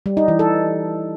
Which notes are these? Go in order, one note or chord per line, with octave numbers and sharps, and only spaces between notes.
G3
D#4
E3
A4